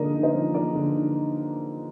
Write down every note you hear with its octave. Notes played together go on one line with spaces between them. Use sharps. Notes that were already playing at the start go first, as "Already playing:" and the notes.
Already playing: D3 F3 A#3 D#4 G#4 A#4 D5 D#5
D#4
C5 D#5
F3
A#3 A#4 D5
D3
D#4